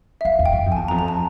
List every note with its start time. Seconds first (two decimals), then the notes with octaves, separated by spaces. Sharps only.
0.21 E5
0.25 F#2 F5
0.39 E2
0.46 G5
0.53 F#2
0.66 F2
0.72 G#5
0.77 E2 A5
0.88 F2 A#5
0.99 A#5
1.08 A5